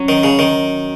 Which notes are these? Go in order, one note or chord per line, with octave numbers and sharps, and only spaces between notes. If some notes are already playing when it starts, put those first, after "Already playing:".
Already playing: F#3 C#4
D#3
C#3
D#3